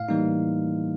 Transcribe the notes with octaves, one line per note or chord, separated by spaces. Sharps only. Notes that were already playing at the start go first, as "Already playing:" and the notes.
Already playing: A2 F5
E3 G3 A#3 D#4
A2